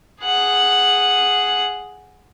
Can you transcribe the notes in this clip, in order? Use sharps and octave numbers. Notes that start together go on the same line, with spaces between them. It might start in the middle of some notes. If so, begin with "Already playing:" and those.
G#4 F#5